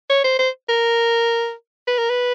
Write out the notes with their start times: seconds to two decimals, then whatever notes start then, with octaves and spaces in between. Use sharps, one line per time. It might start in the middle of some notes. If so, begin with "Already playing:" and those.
0.10 C#5
0.24 C5
0.39 C5
0.69 A#4
1.87 B4
1.99 A#4
2.10 B4